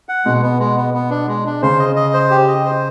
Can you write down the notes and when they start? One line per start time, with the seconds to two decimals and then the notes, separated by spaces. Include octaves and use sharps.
0.09 F#5
0.25 B2 G#3
0.42 B3
0.59 G#3
0.77 B3
0.94 B3
1.10 D4
1.28 G#3
1.45 D4
1.62 C#3 C5
1.79 D#5
1.96 D#5
2.14 C5
2.31 G4
2.48 D#5
2.65 C5